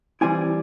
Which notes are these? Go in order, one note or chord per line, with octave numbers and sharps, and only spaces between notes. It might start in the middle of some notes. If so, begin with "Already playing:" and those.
E3 G3 C4 E4 G#5